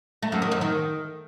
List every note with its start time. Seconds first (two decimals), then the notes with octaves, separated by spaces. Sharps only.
0.22 A3
0.32 F#2
0.42 D#3
0.52 F#2
0.61 D#3